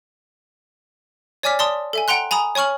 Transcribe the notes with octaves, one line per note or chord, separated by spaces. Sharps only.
C#5 D5 G#5 D6 F6 B6
D5 A5 C6 D#6
A4 E5 G#5
F#5 G5 A#5 C6 F#6
G#5 A#5 B5 D#6
C#5 G#5 C#6 F6 F#7